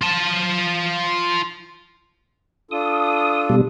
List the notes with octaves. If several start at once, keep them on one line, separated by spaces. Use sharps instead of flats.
F4 A5
D4 F4 A4 D#6
B2 G3